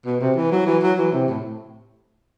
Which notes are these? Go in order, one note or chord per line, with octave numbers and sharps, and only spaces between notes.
B2
C3
E3
F#3
E3
F#3
E3
C3
A2